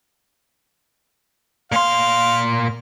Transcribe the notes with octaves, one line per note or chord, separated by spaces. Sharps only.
A#2 F5 C6